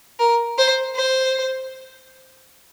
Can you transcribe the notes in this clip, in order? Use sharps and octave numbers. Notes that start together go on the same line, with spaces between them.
A#4
C5
C5